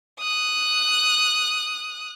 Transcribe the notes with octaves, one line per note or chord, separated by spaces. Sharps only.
D#6 F#6